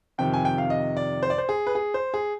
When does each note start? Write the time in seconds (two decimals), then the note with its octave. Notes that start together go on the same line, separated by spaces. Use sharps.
0.18 F2 C3 D#3 G5
0.33 G#5
0.45 G5
0.58 F5
0.70 D#5
0.97 D5
1.23 C5
1.30 D5
1.38 C5
1.49 G#4
1.67 B4
1.75 G#4
1.94 C5
2.14 G#4